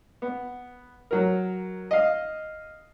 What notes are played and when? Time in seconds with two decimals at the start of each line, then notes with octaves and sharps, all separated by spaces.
0.22 B3
1.11 F#3 A#4
1.91 D#5 F5